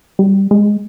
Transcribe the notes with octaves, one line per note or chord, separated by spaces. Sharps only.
G3
G#3